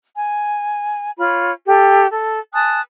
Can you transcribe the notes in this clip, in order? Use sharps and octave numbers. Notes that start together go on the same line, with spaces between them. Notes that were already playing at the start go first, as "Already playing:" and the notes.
G#5
F4 C#5 B5
G4 A4
A4
G#5 A5 D#6 F#6